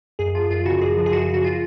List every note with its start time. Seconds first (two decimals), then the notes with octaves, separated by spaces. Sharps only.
0.19 F#2 G#4
0.35 F3 F4
0.50 F#2 F4
0.66 C#3 F#4
0.81 F#2 G#4
0.97 F3
1.06 G#4
1.13 F#2 F#4
1.29 C#3
1.34 F#4
1.44 F4